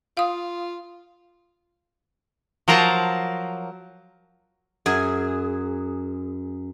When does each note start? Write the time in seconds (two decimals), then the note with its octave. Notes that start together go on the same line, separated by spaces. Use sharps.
0.17 F4 F5 D#6
2.68 F3 F#3 A#4 C5 A5 A#5
4.86 F#2 G#4 G#5